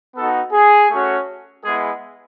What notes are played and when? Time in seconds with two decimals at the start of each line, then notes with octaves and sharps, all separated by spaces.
0.16 B3 D#4 F#4 A4
0.53 G#4
0.91 A3 C#4 F#4
1.64 G#3 B3 E4 G#4